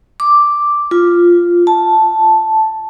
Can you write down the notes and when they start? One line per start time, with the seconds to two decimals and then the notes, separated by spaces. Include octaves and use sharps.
0.20 D6
0.91 F4
1.67 A5